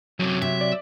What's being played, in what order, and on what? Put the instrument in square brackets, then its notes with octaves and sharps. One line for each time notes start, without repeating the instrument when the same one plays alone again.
[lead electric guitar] F#2 C3 [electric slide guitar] F#3
[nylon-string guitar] C3 [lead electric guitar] E5
[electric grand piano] D5